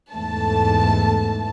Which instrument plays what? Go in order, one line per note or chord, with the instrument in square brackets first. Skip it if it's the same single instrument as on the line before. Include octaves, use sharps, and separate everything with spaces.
[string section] E2 G#2 A3 A5